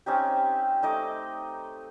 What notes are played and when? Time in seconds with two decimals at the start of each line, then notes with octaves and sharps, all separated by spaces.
0.06 C4 C#4 D#4 G4
0.82 A3 D#4 D#5 D6